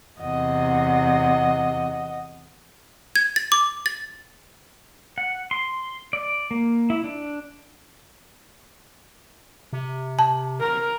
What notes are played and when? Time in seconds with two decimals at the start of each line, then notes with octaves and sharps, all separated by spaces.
0.21 E2 C3 D#5 F#5
3.16 G#6
3.36 A6
3.52 D6
3.86 A6
5.18 F#5
5.51 C6
6.13 D5
6.51 A#3
6.90 E4
7.04 D4
9.73 C3
10.19 A5
10.60 A#4